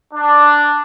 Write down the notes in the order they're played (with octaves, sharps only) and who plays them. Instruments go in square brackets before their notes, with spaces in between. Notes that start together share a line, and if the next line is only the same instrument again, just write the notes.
[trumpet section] D4